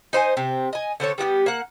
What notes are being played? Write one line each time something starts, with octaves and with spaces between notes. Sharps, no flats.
D#4 C5 G5 G#5
C3 C4
D#5 G#5
D3 C4 A4 C#5
G3 B3 F#4 G4
A#3 F#5